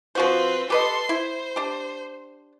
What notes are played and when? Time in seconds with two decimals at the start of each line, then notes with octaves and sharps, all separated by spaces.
0.15 F3 C4 F#4 B4 C5
0.70 G4 A4 B4 D#5 C6
1.09 E4 C5
1.56 D4 G4